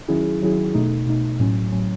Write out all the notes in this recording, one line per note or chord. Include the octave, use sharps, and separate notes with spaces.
D#3 F#3 C#4 E4 G#4
D#3 F#3 C#4 E4 G#4
B2 A3 D#4
B2 A3 D#4
A2 F#3 C#4
A2 F#3 C#4